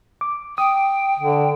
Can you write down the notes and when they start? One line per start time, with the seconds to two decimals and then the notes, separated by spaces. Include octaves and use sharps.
0.21 D6
0.58 G5 D#6
1.20 D3